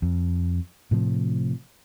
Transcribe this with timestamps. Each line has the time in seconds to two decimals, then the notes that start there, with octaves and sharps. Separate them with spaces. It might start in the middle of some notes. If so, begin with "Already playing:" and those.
0.02 F2
0.91 A2 C3 F3